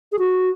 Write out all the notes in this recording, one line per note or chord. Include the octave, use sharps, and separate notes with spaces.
G#4
F#4